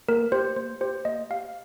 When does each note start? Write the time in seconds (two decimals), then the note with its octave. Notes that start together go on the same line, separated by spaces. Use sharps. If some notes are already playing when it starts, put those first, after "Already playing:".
0.09 A#3 A#4
0.32 G4 C5
0.56 A#3 C5
0.81 G4 C5
1.05 A#3 D#5
1.30 G4 F5